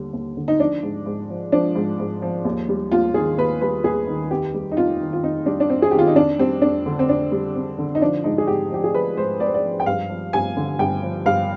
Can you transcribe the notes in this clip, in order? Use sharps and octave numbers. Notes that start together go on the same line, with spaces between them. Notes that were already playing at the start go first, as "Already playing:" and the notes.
Already playing: D#2 D3 G3
D#2
D3
D#4
F3 D4
G#2
G#2
F3
F3 D4
G#2
G#2
F3
D#2
G3
D#2 F4
D#3 G#4
D#2 B4
G3 B4
D#2 G#4
D#3
F2 G4
G3
D#4
F2 F4
D#3
F4
F2 D#4
G3 D4
D4
F2 C4
G#4
D#3 G4
F4
D#4
F2 D4
G3 C4
F2 D4
D3
C4
F2 D4
G3
F2
D3
D#4
F3 D4
G#2 D#4
G#4
G#2 G4
F3 G4
G#4
F3 B4
G#2 C5
G#2 D5
C5
D5
F3
G5
G2 F5
F3
G2 G#5
D3
G2 G5
F3
G2 F5